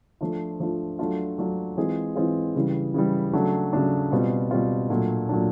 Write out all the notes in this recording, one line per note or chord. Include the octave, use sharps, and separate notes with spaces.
F3 A3 D4 F4
F3 A3 D4 F4
F#3 A3 D4 F4
F#3 A3 D4 F4
E3 G#3 C4 F4 G#4
E3 G#3 C4 F4 G#4
C#3 E3 G3
C#3 E3 G3
C#3 F#3 A3 D4
C#3 F#3 A3 D4
B2 G3 C4 F4
B2 G3 C4 F4
A#2 F#3 A3 D4
A#2 F#3 A3 D4